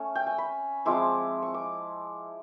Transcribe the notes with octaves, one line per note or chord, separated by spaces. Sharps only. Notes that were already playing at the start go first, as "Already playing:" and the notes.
Already playing: A3 C#4
G5
G#5
B5
F3 G#3 C4 E4 D6
C#6
D6